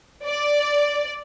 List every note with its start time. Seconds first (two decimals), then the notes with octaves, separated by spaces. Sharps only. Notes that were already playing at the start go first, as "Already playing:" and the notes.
0.24 D5